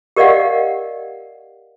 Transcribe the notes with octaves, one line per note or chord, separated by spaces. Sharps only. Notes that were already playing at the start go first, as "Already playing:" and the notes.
G4 A#4 D5 D#5 F5 F#5